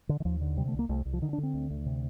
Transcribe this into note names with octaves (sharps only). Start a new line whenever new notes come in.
D3
D#3
D#2 F3
D3
C3 G3
A3
C2
A#3
C2 A3
C2
F3
D3 D#3
D4
D3
C4
D2
D2
C3